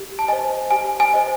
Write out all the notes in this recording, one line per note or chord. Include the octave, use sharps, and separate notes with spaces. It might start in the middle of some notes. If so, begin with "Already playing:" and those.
Already playing: G4
A5
C5 D#5 G#5
G4 G#5
G#5
C5 D#5